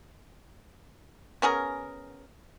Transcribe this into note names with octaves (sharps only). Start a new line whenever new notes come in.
B3 C#4 G#4 A#4